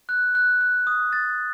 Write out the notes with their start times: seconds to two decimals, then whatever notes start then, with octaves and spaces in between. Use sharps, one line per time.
0.09 F#6
0.35 F#6
0.61 F#6
0.87 D#6
1.13 A6